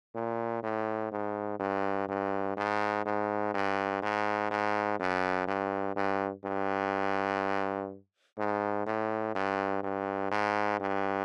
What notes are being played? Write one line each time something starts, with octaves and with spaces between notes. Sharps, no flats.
A#2
A2
G#2
G2
G2
G#2
G#2
G2
G#2
G#2
F#2
G2
G2
G2
G#2
A2
G2
G2
G#2
G2